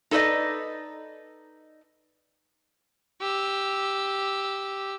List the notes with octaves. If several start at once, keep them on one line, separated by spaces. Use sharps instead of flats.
D#4 A4 B4 C5 D5 D#5
G4 E6